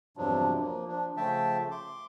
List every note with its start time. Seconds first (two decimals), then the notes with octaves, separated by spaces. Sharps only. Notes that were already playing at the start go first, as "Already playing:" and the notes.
0.17 E2 G2 C3 F3 F#3 D4
0.60 F3 A#3
0.87 F3 D4
1.17 C#3 F3 A3 E5 G5 A5
1.71 C6 D6